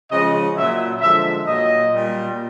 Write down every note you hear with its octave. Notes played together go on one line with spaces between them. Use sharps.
C#3 F3 G#3 D#5
A#2 F#3 E5
D3 F3 G#3 E5
A#2 F#3 D#5
A#2 G3